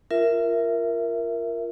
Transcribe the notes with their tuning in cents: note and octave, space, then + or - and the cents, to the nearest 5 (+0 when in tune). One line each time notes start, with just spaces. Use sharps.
F4 -15 A#4 +0 E5 +5